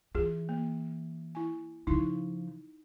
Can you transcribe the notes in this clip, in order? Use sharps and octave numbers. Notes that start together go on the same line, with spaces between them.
E3 F4 G#4
A#3
E4 G#5
C#3 F3 D#4 E4 C#6